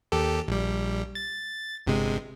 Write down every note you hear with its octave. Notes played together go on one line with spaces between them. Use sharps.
D#2 G4 A4
A#1 G3
A6
G1 C3 G#3